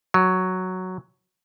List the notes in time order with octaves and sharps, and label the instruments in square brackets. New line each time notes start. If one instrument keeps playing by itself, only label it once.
[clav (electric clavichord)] F#3